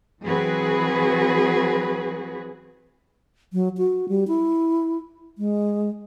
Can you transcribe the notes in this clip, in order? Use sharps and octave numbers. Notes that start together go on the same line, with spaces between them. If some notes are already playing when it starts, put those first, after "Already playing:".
E3 F#3 C4 F#4 G#4 B4
F#3
F#4
G3
E4
G#3